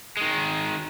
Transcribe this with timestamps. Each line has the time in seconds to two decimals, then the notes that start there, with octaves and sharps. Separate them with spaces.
0.17 D#3 G#3